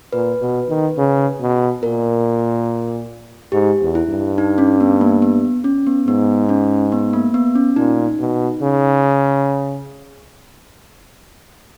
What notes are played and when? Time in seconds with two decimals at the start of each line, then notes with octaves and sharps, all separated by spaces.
0.13 A#2 B4
0.41 B2
0.69 D#3
0.97 C#3
1.41 B2
1.82 A#2 A#4
3.52 G#2 G4
3.81 E2
3.95 E4
4.09 G2
4.38 D#4
4.58 C#4
4.80 B3
5.01 A#3
5.22 B3
5.64 C#4
5.87 B3
6.08 G#2 B3
6.49 C#4
6.92 B3
7.13 A#3
7.34 B3
7.55 C#4
7.76 A#2 D#4
8.19 B2
8.62 C#3